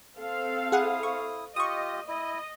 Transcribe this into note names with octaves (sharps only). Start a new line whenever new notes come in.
C4 A4 F5
E4 G#4 F#5 D#6
C#6
F4 G4 D#5 C#6 D#6
E4 D#5